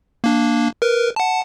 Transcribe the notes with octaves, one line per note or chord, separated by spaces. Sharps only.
A#3 D4
A#4 B4
F#5 A5